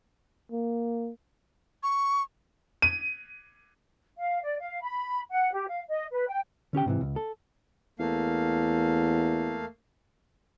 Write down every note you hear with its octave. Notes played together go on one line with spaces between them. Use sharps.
A#3
C#6
D#7
F5
D5
F5
B5
F#5
G4
F5
D#5
B4
G5
D3 C#4 G4 G5
G#2 C3 E3
C#2
A4
E2 A3 A#3 F5